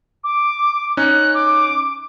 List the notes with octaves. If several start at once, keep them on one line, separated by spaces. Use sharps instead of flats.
D6
C#4 D#4 F#6
D6